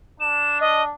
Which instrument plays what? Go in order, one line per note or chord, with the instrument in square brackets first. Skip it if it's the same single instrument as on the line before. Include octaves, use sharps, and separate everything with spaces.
[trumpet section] D4 [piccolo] E7
[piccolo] D#5